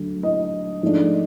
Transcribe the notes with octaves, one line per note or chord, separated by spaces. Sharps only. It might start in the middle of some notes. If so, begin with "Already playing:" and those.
Already playing: D2 D3 F#3 A3
D#5
G#2 F3 A3 D4